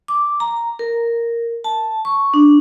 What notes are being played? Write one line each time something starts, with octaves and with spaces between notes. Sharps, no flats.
D6
A#5
A#4
A5
C#6
D4